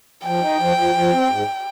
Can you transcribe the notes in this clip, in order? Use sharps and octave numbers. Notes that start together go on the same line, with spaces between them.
F3 G5
D#4
F3
F3
F3
C4
G#2